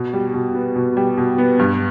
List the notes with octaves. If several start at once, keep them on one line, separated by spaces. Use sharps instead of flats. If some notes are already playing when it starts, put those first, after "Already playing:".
Already playing: B2
G3
B2
B3
B2
G3
B2
B3
G2